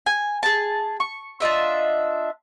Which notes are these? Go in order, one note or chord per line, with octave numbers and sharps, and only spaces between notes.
G#5
G#4 A5
C#6
D4 F4 D#5 E5